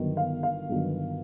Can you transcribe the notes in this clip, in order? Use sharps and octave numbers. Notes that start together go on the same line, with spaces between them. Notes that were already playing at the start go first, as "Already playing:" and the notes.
Already playing: G1 G2 D#3 F#3 B3
F5
F5
G1 G2 D#3 F#3 B3